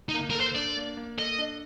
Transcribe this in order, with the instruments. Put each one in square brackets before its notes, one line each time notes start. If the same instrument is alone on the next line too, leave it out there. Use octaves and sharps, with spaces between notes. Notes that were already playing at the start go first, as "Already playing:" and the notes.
[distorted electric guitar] D#4
[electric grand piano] A#3
[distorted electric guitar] A#4
[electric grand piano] A4
[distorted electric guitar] C5
[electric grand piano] D4 [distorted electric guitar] D5
[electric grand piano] A#3
A#3
[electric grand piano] A4 [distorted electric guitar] D#5
[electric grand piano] D4